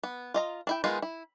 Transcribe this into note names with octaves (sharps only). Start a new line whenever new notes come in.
B3
F4 D#5 A#5
D4 E4 G5
D#3 G#3 B3 D#4 F4
E4